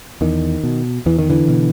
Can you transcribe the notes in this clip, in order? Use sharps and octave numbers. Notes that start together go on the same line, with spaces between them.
E2 D#3
B2
E2 E3
D#3
D3 E3
B2